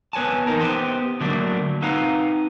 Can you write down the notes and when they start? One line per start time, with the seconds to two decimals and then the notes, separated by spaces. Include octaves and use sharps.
0.13 B3 B4 C#5 G#5 A5
0.47 E2 B2 D#4 A#4
0.61 B3 G4 C5
1.20 D3 F#3 A3 A#3 D4
1.82 C4 D#4 B4 F5 F#5 A#5